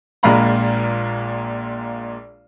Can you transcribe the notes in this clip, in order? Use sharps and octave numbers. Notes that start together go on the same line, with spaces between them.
A#1 A#2 G#3 F5 A#5 B5